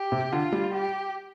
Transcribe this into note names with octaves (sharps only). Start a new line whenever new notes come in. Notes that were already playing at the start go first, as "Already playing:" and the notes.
Already playing: G4
C3
D3 F4
G3
G4